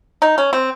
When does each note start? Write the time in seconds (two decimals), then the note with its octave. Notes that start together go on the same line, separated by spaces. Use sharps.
0.22 D#4
0.38 C#4
0.53 C4